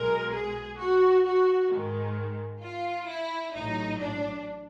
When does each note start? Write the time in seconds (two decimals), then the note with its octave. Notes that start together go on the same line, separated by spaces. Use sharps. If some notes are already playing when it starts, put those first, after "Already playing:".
Already playing: B1 B2 G#3 A#4
0.32 G#4
0.79 F#4
1.25 F#4
1.71 G#2 D#3 G#3
2.63 F4
3.09 E4
3.55 A1 A2 F#3 D#4
4.01 D4